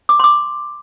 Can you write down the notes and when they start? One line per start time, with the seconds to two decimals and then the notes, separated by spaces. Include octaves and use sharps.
0.09 D6
0.20 C6
0.24 D6